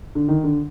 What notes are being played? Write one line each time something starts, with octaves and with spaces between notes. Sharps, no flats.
D3
D#3
D3